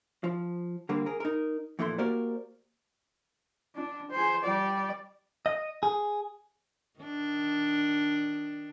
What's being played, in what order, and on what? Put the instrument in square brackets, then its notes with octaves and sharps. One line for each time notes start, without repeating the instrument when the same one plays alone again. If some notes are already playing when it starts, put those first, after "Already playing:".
[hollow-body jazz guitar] F3
D3 G3 A#3 C4
G#4 A#4
D#4 A#4
F2 A#2 E3 A3 E4 C6
A#3 F#4 G4 A#4 C5 D5
[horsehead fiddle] D4
G#4 C5
G3 D5
[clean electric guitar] D#5
G#4
[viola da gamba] D#3 D4